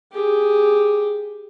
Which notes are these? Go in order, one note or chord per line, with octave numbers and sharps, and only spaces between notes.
G4 G#4